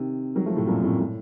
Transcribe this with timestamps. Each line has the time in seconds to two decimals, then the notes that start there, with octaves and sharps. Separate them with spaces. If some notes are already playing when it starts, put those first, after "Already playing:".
Already playing: C3 D#3
0.35 D#3 F#3
0.46 F3 A3
0.56 A2 C3
0.67 F#2 A#2
0.83 F2 A2
0.99 A2